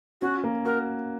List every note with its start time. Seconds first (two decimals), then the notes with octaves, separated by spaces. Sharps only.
0.22 C#4 F#4
0.44 A#3
0.65 F#4 A#4